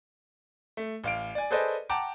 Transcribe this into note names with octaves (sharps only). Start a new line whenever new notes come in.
A3
A1 F5 D7
D5 G#5
G#4 A4 B4 C5 D5 D#5
F#5 G5 A5 A#5 D6